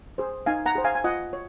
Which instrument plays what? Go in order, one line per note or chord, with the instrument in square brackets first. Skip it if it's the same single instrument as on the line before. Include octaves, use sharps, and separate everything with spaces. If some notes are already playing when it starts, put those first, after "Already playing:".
[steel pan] G#4 C5
D#4 F5 G#5
F#5 A#5
G#4 C5
F5 G#5
G#5
F4 D#5 F#5
C#5